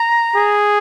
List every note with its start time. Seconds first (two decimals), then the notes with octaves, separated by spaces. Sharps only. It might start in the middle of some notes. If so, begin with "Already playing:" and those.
Already playing: A#5
0.35 G#4